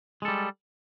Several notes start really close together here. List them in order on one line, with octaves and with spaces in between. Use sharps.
G#3 A4 G3